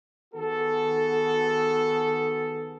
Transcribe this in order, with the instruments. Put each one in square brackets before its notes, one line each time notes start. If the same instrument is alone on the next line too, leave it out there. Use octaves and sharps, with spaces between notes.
[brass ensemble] D#3 B3 F#4 G#4 A4